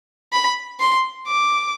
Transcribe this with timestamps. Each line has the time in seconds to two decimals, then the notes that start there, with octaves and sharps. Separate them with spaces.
0.33 B5
0.80 C6
1.27 D6